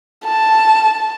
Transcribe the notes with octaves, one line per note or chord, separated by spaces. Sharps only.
A5